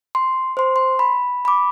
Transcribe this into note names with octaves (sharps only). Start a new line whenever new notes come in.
C6
C5 C6
C6
B5
B5 D6